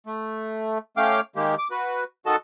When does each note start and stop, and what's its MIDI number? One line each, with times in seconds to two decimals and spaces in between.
0.06 0.78 57
0.97 1.21 57
0.97 1.21 61
0.97 1.21 77
0.97 1.21 79
0.97 1.21 86
0.97 1.21 89
1.36 1.55 51
1.36 1.55 56
1.36 1.55 58
1.36 1.55 67
1.58 1.68 86
1.71 2.04 66
1.71 2.04 71
2.26 2.36 51
2.26 2.36 66
2.26 2.36 69
2.26 2.36 75
2.26 2.36 81